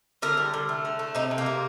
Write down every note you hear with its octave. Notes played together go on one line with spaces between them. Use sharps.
D3 A#4
G3
D3
A3
D3
A3
C3 D#4
C3
A#3
C3